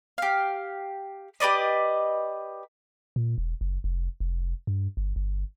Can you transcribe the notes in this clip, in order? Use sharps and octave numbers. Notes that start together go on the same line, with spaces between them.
G4 F5
G4 B4 D5 D#5
A#2
E1
F#1
F1
F1
G2
G1
G1